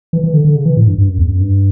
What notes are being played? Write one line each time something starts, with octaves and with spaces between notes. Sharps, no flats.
E3
E3
D3
D3
C#3
E3
A2
G2
G2
F#2
E2
F#2
G2